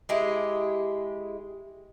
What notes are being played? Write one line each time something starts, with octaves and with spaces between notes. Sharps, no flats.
G#3 E4 G4 G#4